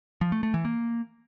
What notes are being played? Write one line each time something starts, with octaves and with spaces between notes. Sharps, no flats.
F3
A3
A3
E3
A#3